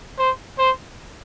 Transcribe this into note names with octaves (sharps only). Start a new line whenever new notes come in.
C5
C5